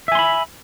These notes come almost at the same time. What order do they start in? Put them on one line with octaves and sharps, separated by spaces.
E5 G#5 C6 B5